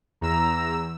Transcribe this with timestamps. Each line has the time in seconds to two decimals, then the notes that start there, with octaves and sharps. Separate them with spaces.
0.21 E2 A#5 E6